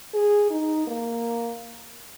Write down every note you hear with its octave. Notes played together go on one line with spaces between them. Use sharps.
G#4
D#4
A#3